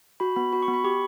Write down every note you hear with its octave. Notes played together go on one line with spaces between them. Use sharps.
F#4 B5
B3 B5
F#4 B5
C#6
B3
B5
G4 C#6